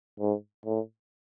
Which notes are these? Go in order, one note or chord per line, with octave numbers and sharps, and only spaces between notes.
G#2
A2